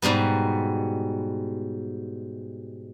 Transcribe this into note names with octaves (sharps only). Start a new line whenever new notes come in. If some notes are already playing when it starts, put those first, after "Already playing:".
G#2 B2 G3 B3